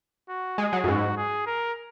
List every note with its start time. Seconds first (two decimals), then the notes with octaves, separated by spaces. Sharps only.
0.29 F#4
0.58 G#3 G#4
0.73 F#3
0.84 F#2
0.88 G#2 F#4
1.17 G#4
1.46 A#4